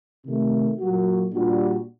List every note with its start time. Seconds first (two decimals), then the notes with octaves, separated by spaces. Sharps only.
0.24 C3 D#3 A3
0.78 A#2 F#3 A#3 F#4
1.32 A#2 G3 D4 F#4